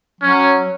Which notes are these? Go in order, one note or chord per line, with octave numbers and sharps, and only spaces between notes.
F#3 C#4